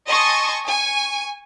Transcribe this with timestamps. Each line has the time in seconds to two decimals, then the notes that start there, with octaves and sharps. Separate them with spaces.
0.10 D#5 G#5 A5 C6 C#6 D#6
0.67 G#5 C#6